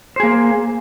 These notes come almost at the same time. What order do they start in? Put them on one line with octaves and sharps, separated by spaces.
C5 G#4 A#3